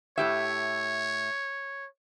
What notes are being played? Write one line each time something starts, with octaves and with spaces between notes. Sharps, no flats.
A2 G4 C#5 E5